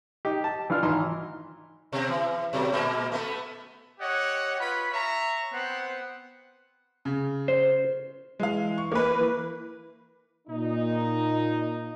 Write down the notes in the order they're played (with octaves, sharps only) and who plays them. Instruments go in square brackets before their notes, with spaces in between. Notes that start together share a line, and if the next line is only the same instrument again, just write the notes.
[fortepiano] D#4 G4
A5
E3 D4 F4 F6
G#1 E3 D#4 A#5 C6
[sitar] B2 C4
E3
B2 F#3 A4
A#2 G#3 A#3
A3 B3 A4
[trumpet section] G4 C#5 D#5 F#5
F4 B4 C#5 B5
C#5 E5 A#5
B3 C4 C5 F#5
[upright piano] C#3
[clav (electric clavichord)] C5
[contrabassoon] E3 [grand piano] G#3 F5
[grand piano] C#6
[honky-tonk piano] A#3 B4
[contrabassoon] E3
[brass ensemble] A#2 D#4